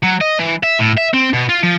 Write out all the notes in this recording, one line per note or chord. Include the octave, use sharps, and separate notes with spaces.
F#3
D#5
E3
E5
A2
E5
C4
B2
F4
F3